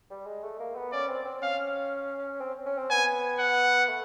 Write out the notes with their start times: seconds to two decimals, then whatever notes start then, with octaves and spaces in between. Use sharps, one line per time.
0.10 G3
0.26 G#3
0.43 A3
0.60 A#3
0.76 B3
0.92 C#4 D5
1.09 C4
1.25 C4
1.42 C#4 F5
2.41 C4
2.66 C#4
2.78 C4
2.90 B3 G#5
3.39 F#5
3.89 A3